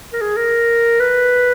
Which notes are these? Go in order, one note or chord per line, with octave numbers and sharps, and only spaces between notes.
A#4
G#4
A#4
B4